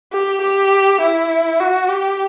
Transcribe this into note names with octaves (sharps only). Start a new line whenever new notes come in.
G4
G4
E4
F#4
G4